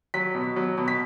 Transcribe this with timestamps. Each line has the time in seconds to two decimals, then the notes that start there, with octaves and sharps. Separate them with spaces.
0.14 F#3 B6
0.35 B2
0.56 F#3
0.78 B2
0.88 B6